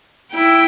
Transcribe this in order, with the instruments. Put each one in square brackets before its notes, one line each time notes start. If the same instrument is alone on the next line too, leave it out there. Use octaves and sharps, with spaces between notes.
[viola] E4 [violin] G5